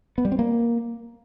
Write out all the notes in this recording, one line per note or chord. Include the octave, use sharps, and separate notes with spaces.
B3
G3
C4
A#3